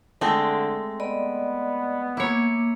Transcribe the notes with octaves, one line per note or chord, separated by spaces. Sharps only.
D3 G#3 A3 C4
B3 D5 D#5 B5
A#3 E4 C#5 D6